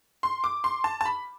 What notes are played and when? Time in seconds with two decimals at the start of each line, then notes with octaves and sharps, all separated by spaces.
0.23 C6
0.44 D6
0.64 C6
0.84 A5
1.01 A5
1.05 B5